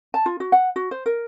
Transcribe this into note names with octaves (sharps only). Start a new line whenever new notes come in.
A5
F4
F#4
F#5
F#4
C5
A#4